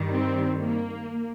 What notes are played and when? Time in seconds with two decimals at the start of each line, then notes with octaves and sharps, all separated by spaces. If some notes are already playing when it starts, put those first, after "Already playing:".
Already playing: G2 D#3 G3
0.14 C4
0.61 A#3